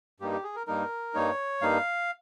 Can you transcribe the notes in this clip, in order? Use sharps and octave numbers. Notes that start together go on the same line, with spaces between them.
G2 G3 A#3 D#4 G4
G4
G#4
A#4
G2 G3 A#3 D#4 A#4
G2 G3 A#3 D#4 C#5
G2 G3 A#3 D#4 F5